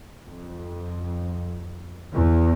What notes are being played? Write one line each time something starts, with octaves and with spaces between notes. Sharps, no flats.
F2
E2